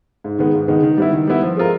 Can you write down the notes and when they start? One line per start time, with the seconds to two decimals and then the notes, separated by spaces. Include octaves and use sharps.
0.24 G#2
0.39 D#3 G#3 B3
0.54 G#2
0.68 D#3 G#3 B3
0.83 D#3
0.98 G3 B3 E4
1.13 D#3
1.27 G3 B3 E4
1.42 F3
1.57 G#3 C4 F4 A#4